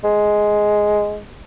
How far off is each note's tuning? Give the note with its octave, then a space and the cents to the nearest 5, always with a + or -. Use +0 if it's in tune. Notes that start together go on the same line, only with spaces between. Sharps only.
G#3 +5